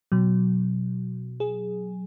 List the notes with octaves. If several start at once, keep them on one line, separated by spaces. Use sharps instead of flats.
B2 F#3
G#4